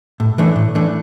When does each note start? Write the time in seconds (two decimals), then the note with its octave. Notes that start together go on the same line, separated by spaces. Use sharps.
0.20 A2
0.38 E3 A3 D4
0.56 A2
0.75 E3 A3 D4